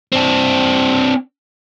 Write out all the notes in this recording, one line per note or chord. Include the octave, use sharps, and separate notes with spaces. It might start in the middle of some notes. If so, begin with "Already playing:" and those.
C4 D4